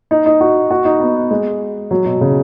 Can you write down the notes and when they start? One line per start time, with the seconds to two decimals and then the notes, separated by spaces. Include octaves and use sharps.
0.11 D#4
0.26 D#4
0.41 F#4
0.71 F#4
0.85 D#4
1.00 B3
1.31 G#3
1.91 F#3
2.05 B2
2.21 C#3